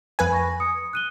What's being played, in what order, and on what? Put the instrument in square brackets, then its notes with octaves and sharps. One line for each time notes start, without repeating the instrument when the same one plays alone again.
[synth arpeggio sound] F2 B4 G#5
[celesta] C#6 A#6
D#6 C#7
F#6 D#7 G7